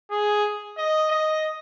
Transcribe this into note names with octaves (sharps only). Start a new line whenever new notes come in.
G#4
D#5
D#5